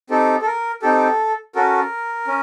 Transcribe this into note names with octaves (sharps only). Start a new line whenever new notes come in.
C4 D#4 G4 A4
A4
A#4
C4 D#4 G4 A4
C#4 F#4 A4 A#4
C#4